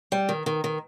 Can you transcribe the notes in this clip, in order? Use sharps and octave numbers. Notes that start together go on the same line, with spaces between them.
G3
D#3
D#3
D#3